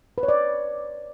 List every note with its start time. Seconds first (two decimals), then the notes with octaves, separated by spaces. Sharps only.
0.18 B4
0.23 C#5
0.29 D5